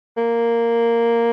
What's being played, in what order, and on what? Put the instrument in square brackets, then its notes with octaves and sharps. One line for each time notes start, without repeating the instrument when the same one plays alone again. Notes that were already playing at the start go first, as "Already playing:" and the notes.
[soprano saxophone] A#3